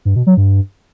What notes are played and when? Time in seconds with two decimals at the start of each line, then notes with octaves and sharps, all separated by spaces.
0.05 G2
0.16 B2
0.27 F#3
0.37 G2